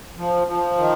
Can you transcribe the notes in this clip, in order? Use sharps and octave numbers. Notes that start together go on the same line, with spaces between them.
F3
F3
D#3